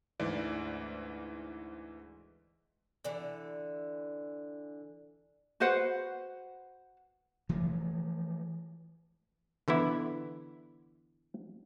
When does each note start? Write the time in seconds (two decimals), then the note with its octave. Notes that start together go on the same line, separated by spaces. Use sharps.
0.20 D2 G#2 E3 D5
3.04 D3 E3
5.60 F#4 B4 C5 F#5
7.49 E3 F3 G#3 A3
9.68 D3 E3 B3 E4